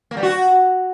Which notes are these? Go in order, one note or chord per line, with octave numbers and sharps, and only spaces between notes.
A#3
G3
F#4